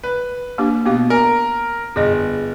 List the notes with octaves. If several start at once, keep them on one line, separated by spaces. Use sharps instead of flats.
B4
A#3 D4 G4
B2 B3 G4 F5
A#4 G#5
G1 G#4 D#5